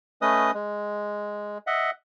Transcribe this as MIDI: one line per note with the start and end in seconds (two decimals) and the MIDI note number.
0.22 0.51 57
0.22 0.51 61
0.22 0.51 71
0.22 0.51 75
0.22 0.51 87
0.54 1.58 56
1.67 1.91 75
1.67 1.91 76
1.67 1.91 78